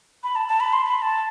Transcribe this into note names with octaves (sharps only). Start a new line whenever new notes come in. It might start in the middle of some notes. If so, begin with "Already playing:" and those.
B5
A5
A5
B5
C6
B5
A5